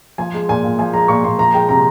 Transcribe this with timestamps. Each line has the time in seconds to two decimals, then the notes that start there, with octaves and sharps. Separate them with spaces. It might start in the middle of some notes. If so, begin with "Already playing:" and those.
0.18 F3 G#5
0.34 G#3
0.49 A#2 G#5
0.64 A#2
0.79 F3 G#5
0.93 G#3 A#5
1.08 A#2 C#6
1.24 A#2 C6
1.39 F3 A#5
1.54 G#3 G5
1.69 C3 A#5